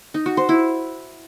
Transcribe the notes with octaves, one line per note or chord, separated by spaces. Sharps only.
D#4
F#4
C5
E4